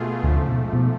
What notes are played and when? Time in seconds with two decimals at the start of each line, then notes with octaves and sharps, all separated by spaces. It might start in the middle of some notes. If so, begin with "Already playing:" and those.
Already playing: B2 A3 F4 G#4
0.23 D2 G#2 D3 F3 A3
0.36 C#3
0.49 B2
0.73 B2